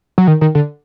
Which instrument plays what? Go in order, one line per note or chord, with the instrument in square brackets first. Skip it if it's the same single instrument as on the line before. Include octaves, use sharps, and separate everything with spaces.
[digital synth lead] F#3
D#3
D#3
D3